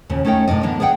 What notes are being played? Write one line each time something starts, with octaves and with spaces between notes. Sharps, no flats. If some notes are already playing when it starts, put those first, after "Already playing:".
D#2 A#2 C#3 A#3
A3 C#4 D#4 A#4 G5
A2 C3 D5 D#5
D3 E3 A#3 B3
G#4 B4 D#5 F#5 G5